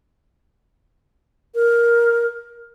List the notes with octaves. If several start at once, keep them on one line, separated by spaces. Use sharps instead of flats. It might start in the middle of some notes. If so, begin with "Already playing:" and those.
A#4